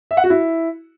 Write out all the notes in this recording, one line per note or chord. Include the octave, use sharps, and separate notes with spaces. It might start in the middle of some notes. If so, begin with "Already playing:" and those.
E5
F#5
F#4
E4